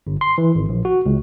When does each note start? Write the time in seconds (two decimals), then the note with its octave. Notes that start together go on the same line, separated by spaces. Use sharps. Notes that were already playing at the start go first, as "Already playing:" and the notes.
0.07 G1
0.21 C6
0.38 E3
0.55 G#1
0.69 A#1
0.85 F#4
1.06 C#2